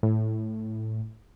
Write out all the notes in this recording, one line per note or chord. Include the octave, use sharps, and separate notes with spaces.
A2